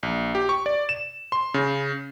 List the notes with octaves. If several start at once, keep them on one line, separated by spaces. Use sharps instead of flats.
A#1
G4
C#6
D5
E7
C6
C#3